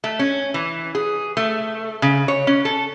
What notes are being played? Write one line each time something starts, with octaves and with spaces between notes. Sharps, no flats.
A3
C#4
E3
G#4
A3
C#3
C#5
C#4
A4